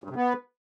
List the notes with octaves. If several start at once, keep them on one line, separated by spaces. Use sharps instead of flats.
G2
C3
B3